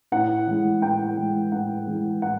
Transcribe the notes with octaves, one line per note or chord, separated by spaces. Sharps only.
A2 F#5
E3 G#3
A2 G5
E3 G#3
A2 F#5
E3 G#3
A2 F#5